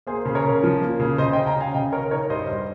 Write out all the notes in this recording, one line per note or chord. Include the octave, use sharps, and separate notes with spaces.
A#3 G#4 C5
C#3
A#4 C#5
C#3
F3
A#3
C#3
C#3 C5 D#5
D#5 G5
C#3
G5 A#5
C#3 F5 G#5
C#3 D#5 G5
C#3 A#4 C#5
D#4 A#4 C#5
G2 C5 D#5
G2